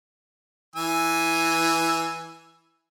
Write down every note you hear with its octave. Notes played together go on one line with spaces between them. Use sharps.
E3 G#5 E6